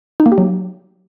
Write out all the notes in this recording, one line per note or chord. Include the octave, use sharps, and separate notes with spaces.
D#4
A#3
G4
F#3